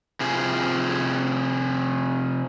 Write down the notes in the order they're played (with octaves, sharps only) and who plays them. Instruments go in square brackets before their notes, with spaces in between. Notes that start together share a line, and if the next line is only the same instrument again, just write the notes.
[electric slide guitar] C3 F3 G#4